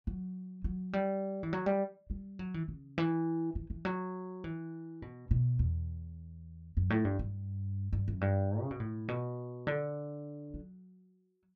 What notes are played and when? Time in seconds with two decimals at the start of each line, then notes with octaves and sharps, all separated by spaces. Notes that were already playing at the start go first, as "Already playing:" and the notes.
0.07 F#3
0.64 F#3
0.93 G3
1.43 E3
1.53 F#3
1.66 G3
2.10 G3
2.39 F#3
2.54 E3
2.68 C#3
2.98 E3
3.55 E3
3.70 E3
3.85 F#3
4.44 E3
5.02 B2
5.31 B2
5.59 E2
6.77 F#2
6.90 A2
7.05 G2
7.19 G2
7.93 G2
8.08 F#2
8.21 G2
8.62 C#3
8.71 B2
8.80 A2
9.08 B2
9.67 D3
10.54 F#3